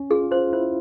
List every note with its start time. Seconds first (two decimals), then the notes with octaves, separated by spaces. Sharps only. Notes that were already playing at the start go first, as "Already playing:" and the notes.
Already playing: C#4
0.10 F4 G#4
0.31 F4 C5
0.53 E4 C5